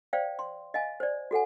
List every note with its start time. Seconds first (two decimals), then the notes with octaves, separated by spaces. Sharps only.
0.13 C5 D5 F5 G5
0.39 C6
0.74 D#5 F5 G#5
1.00 C5 D5
1.31 F#4 A4 F#5 G#5